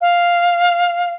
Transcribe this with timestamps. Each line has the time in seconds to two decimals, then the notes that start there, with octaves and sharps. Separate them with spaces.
0.01 F5